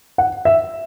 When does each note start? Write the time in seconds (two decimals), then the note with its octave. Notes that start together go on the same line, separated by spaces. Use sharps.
0.18 F#5
0.45 E5